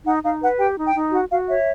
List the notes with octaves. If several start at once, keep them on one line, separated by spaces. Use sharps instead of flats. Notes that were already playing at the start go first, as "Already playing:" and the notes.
D#4 F#5
D#4 F5
B4 F#5
G4 G5
D#4
G5
D#4
F#4 F#5
F#4 F5
C#5 E5